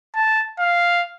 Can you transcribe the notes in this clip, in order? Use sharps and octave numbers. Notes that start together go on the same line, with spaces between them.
A5
F5